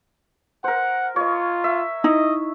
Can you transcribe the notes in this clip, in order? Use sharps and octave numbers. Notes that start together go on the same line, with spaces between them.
A#4 C5 F#5
F4 C#5 D#5
E5
D#4 E4 D#5